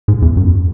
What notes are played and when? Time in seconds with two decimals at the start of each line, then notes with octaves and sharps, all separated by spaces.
0.08 G#2
0.22 E2
0.37 F#2